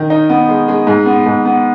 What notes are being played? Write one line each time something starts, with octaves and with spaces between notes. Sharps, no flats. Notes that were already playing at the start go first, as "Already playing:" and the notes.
Already playing: D#3
D#4
B3
G#3
G#3
G#2
B3
G#2
B3